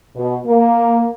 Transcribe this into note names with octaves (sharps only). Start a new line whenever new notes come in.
B2
A#3